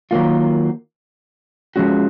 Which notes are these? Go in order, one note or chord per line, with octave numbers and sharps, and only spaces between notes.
D#3 F#3 A#3 F4
F3 G#3 C#4 F#4